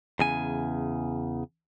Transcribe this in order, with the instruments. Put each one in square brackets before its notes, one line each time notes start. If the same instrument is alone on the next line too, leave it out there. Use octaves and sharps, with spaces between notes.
[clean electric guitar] E2 C#3 G#5